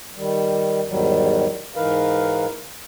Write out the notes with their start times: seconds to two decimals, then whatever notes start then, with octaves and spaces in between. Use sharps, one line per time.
0.15 D#3 G3
0.87 E2 G#2 D#3 F#3 G3
1.75 G#2 E3 D#4 A#4 B4 F5